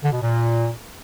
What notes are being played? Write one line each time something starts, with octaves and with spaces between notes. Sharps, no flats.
D3
B2
A#2